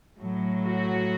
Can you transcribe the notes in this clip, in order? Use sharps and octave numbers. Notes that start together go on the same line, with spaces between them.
A2 F#3
F#4